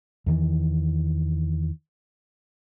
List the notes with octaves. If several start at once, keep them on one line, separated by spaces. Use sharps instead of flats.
E2 D#3 E3